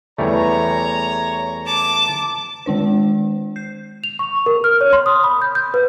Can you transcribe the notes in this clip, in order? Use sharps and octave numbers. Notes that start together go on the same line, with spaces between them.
E2 G3 A3 C#5 A#5
A5 D6
D#3 G#3 D4 C5
G6 C7
F7
C#6
A#4
F6
C#5
C6
D#6
B5
G6
G6
B4